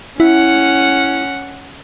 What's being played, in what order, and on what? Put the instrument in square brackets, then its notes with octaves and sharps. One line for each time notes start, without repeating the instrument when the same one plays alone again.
[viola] C#4 F#5 [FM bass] E4